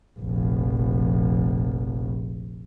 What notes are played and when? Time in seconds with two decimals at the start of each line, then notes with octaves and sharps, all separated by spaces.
0.19 F1 A#1